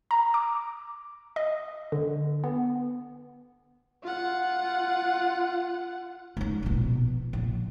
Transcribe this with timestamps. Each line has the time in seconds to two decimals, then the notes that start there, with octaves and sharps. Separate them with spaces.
0.11 A#5
0.34 D6
1.36 D#5
1.92 D3
2.44 B3
4.03 F4 F#5
6.37 G#3 D#4
6.63 A#1 B2
7.33 A#1